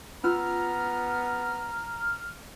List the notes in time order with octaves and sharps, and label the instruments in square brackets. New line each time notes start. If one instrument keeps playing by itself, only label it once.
[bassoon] B3 [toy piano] C#4 F4 E6 [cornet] A#5 [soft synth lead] F6